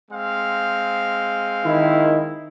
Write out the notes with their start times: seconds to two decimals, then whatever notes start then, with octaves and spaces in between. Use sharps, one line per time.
0.11 G#3 C4 F5
1.64 D#3 E4